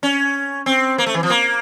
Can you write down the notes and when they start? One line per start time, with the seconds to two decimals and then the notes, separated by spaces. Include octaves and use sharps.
0.03 C#4
0.66 C4
0.98 A#3
1.06 A3
1.14 E3
1.23 F3
1.30 A#3